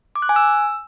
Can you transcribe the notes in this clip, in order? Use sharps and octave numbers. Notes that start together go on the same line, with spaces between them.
D6
F#6
G#5
E6